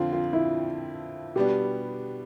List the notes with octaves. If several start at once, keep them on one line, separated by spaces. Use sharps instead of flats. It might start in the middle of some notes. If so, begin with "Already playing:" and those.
Already playing: F2 D3 F3 C4 F4
F4
E4
B2 G3 B3 D4 G4